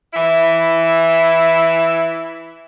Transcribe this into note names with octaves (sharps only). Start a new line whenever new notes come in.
E3 E4 E5